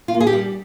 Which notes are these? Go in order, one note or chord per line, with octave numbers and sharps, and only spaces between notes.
F4
A#3
G#4
G4
G3